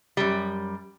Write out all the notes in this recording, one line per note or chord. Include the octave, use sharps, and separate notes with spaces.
F#2 G3